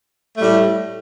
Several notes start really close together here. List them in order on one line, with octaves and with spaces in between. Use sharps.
A3 G3 A2